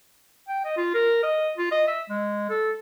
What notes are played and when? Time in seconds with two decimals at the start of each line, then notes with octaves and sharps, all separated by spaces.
0.48 G5
0.65 D#5
0.77 F4
0.94 A#4
1.23 D#5
1.57 F4
1.71 D#5
1.87 E5
2.09 G#3
2.49 A4